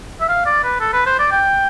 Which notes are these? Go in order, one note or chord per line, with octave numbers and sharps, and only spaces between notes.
E5
F5
D5
B4
A4
B4
C5
D5
G5